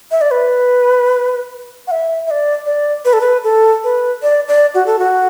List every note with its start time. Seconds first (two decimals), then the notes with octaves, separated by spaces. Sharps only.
0.11 E5
0.21 D5
0.31 B4
1.87 F#5
1.91 E5
2.27 E5
2.31 D5
2.66 D5
3.05 B4
3.13 A4
3.21 B4
3.44 A4
3.84 B4
4.22 D5
4.48 D5
4.74 F#4
4.86 A4
4.99 F#4